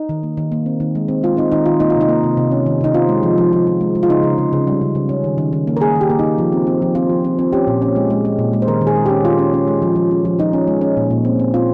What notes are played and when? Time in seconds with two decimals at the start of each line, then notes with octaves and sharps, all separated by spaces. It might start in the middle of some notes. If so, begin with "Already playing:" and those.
Already playing: D#4
0.09 D#3
0.23 A#3
0.37 D#3
0.52 A#3
0.66 C4
0.80 D#3
0.95 G#3
1.08 C4
1.23 G#3 F4
1.37 C4 D#4
1.52 D#3 D#4
1.66 D#3 F4
1.80 A#3 D#4
1.90 F4
1.95 C3
2.01 D#4
2.09 A#3
2.24 C3
2.37 C3
2.52 C#4
2.66 D#3
2.81 C3 D#4
2.94 C4 F4
3.09 G#3
3.23 F3
3.38 F3
3.53 F3
3.67 F3
3.81 G#3
3.95 G#3
4.03 F4
4.10 C#3 D#4
4.23 C#3
4.38 C#3
4.53 C#3
4.67 G3
4.81 C#3
4.95 C#3
5.09 C#4
5.24 D#3
5.38 D#3
5.53 D#3
5.67 A#3
5.77 A#4
5.81 A#3 G#4
5.96 D#3
6.01 G4
6.10 A#3
6.19 D#4
6.25 D#3
6.38 F3
6.52 C4
6.67 C4
6.82 F3
6.95 C4 F4
7.09 F3
7.25 C4
7.39 C4
7.53 C#4 G4
7.67 A#2
7.82 C#4
7.96 G#3
8.10 G#3
8.25 G#3
8.39 A#2
8.53 G#3
8.62 C5
8.68 D#3 A#4
8.81 D#3
8.87 G#4
8.96 G#3
9.06 C#4 G4
9.25 D#3 F4
9.39 C#4
9.54 C#4
9.68 G#3
9.82 F3
9.96 F3
10.11 C#4
10.25 F3
10.39 F3 D#4
10.53 C#4
10.67 G#3
10.81 C#4
10.97 A#2
11.10 A#2
11.25 C4
11.40 C4
11.54 C4 F4